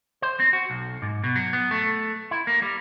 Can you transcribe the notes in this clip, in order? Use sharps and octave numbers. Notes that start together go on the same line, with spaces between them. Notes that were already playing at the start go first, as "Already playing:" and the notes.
C5
C4
F#4
B1
G#2
B2
F#3
B3
A3
E4
A#3
G3